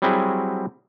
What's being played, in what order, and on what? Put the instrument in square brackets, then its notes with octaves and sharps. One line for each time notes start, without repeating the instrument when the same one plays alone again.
[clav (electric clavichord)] F#3 G3 C4 E4 F#4 G#4